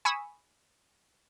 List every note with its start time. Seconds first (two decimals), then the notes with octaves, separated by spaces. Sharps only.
0.05 G#5 B5 C#6 D#6 E6